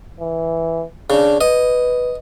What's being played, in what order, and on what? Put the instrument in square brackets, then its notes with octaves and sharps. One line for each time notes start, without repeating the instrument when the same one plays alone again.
[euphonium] E3
[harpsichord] C#3 [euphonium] D4
[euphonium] B4 [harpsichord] D#5